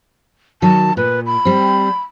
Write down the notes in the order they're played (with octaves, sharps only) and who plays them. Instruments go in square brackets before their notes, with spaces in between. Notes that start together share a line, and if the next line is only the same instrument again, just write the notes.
[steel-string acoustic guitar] D#3 F#3 [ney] A5
[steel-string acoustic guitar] A#2 [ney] B4
[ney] B5
[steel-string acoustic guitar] G3 C4